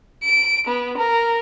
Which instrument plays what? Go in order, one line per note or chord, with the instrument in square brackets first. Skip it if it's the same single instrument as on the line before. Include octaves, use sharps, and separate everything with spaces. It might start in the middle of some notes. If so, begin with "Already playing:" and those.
[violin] D7
B3
A#4